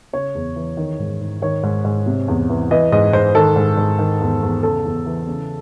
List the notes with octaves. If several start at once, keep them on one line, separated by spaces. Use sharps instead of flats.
C#3 C#5
E2
E3
D#3
G#2
G#2
D#3 C#5
G#2
G#2
C3
E2
E3
E3 D#5
G#2 D#5
G#2 C5
D#3 A4
G#2
G#2
D#3
E2
E2
C#3 A4
E2
E3
C#3